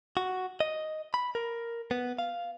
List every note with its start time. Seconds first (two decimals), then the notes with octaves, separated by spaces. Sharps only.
0.17 F#4
0.60 D#5
1.14 B5
1.35 A#4
1.91 B3
2.19 F5